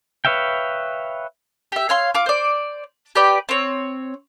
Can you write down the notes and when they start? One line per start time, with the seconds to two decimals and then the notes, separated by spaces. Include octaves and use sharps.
0.25 B4 C#5 E5 F5 G5
1.72 G4 E5
1.89 C#5 F5 C6
2.15 F4 D6
2.26 C5 D5
3.15 G4 B4 D5 G5
3.49 C4 C#5